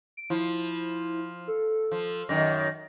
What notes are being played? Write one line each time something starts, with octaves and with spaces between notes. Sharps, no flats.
D7
F3 E4
A4
F3
F#2 D#3 A#6